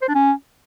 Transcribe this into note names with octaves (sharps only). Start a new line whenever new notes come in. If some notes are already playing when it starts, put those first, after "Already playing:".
C5
D4
C#4